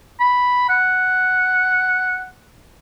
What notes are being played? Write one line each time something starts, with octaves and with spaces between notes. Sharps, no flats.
B5
F#5